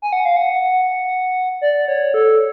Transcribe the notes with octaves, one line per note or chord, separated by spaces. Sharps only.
G#5
F#5
F5
F#5
D5
C#5
A4